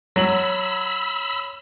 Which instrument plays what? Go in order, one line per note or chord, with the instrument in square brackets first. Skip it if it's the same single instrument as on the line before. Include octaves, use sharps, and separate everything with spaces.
[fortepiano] F#3 [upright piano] C#5 F#7 [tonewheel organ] B5 E6